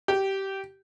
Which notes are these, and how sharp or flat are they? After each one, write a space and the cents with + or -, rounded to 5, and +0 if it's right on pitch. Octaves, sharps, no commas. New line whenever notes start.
G4 -15